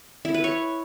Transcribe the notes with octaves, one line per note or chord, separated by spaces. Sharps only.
E4
B4
C#5